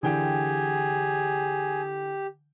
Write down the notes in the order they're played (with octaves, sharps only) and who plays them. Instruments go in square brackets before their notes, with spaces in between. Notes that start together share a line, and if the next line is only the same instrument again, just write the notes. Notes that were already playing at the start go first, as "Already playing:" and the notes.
[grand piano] D3 E3 G5 [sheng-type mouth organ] G4 [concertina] G#4